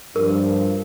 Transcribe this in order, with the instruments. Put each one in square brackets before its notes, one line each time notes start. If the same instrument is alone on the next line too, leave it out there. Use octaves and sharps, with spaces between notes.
[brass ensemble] G2 F3 [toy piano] A#4